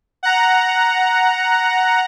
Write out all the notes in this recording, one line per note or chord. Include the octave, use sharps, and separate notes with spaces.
F#5 A#5